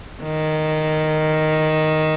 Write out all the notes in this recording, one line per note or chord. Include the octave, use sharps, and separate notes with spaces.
D#3